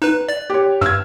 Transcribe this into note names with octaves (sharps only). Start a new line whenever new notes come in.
D#4 B4 F#6 E7
D5 A6
G4 C#5
G2 E6 F6 G#6